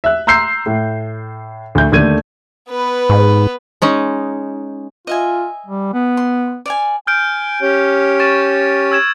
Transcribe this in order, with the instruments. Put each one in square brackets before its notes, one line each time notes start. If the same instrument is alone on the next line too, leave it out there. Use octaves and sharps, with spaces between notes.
[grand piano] E5 F#6
A#5 C6 E6 G6 C7
A2
D2 G6
D#2 D3 A3 G#6 D#7
[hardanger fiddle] B3 B4
[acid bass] G#2
[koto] G#3 C#4 D#4
[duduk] F4 [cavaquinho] D#5 E5 G#5
[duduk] G3
B3
[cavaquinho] C6
D5 F5 G#5
[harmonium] G#5 [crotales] F6 G6 D7
[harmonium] C#4 G4 C#5
[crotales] C#6 A6 E7
E6 G#6 E7